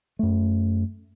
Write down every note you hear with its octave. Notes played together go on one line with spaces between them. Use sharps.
F#2 A3